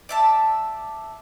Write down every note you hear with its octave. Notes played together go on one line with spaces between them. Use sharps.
D5 E5 A5